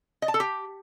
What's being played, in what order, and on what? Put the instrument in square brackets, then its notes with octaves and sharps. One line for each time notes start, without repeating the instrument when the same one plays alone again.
[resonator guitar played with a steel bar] D#5
A5
A4
G4